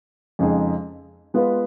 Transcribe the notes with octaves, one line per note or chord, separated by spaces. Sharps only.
F2 C#3 G#3 D#4 G#4
G#3 B3 F4 B4